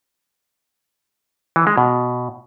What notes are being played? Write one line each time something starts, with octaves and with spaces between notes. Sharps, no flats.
E3
G#3
B2